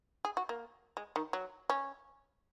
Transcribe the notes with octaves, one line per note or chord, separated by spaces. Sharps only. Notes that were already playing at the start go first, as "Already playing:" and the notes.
G#4
F#4
A#3
G#3
D#3
F#3
C#4